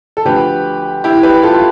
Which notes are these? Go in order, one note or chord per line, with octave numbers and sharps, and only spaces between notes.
A4
D2 D3 F3 G4 B4
E4 G4
G4 B4
F4 A4
F4